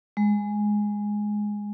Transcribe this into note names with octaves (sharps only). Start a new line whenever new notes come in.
G#3